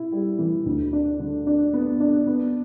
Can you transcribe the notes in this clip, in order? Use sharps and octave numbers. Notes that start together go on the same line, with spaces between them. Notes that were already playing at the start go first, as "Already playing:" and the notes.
Already playing: E4
G3
E3
D2
D4
D3
D4
B3
D4
B3